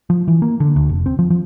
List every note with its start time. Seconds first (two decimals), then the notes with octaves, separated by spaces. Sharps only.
0.10 F3
0.28 E3
0.42 A#3
0.60 D3
0.76 D2
0.89 F1
1.06 C4
1.19 F3
1.30 F3